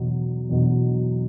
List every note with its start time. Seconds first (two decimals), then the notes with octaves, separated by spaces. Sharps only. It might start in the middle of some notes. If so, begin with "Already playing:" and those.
Already playing: E2 B2 F#3
0.49 E2 B2 F#3